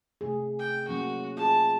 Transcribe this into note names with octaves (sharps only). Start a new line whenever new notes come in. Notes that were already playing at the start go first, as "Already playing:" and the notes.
C3 A3 G#4
G5
F#3 A#3 C#4 F#4
F4 G#4 A5